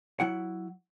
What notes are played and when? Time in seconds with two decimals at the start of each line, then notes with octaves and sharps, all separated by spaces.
0.20 F#3 E4 F#5